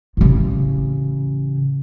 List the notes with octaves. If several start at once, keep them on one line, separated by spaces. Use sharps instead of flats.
A1 C#3